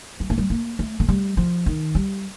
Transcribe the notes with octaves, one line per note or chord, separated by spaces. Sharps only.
G3
A3
G3
A#3
A3
A3
G3
F3
D#3
G3